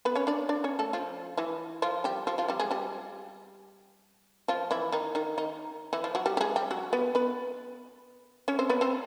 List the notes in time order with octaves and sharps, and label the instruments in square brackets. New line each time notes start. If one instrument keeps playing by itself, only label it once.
[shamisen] B3 B4
C#4 C#5
D4 D5
D4 D5
C#4 C#5
A3 A4
F3 F4
E3 E4
F3 F4
G3 G4
F3 F4
F3 F4
G3 G4
G#3 G#4
G3 G4
F3 F4
E3 E4
D#3 D#4
D#3 D#4
D#3 D#4
E3 E4
F3 F4
F#3 F#4
G3 G4
G4
G#3 G#4
G3 G4
F#3 F#4
B3 B4
B3 B4
C#4 C#5
C4 C5
B3 B4
C4 C5